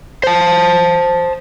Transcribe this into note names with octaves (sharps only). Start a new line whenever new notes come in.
C5 A5